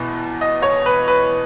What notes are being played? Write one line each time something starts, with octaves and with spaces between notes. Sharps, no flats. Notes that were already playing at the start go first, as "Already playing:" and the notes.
Already playing: E2 B2 B3
D#5
C#5
B4
B4